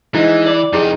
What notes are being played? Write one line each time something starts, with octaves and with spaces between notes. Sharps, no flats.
E3 G#3 D#4 E4
D5
F2 D#4 E4 G4 G#4